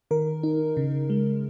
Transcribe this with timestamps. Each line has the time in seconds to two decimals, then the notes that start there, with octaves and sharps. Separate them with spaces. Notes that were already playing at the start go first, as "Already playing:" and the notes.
0.11 D#3 A#4
0.43 D#4
0.77 C#3
1.10 G#3